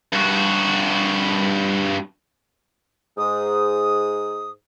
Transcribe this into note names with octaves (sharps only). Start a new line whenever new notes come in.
G2 F#4
G#2 D#6